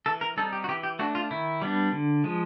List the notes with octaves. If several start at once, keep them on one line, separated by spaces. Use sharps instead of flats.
E3 A4
A#4
G3 C4 D#4 A4
G4
F#4
E3 G4
G4
A3 D4 F#4
F4
D#3 E4
G3 B3 D4
D3
F3 G#3